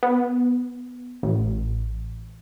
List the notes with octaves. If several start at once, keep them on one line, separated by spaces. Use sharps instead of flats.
B3
A1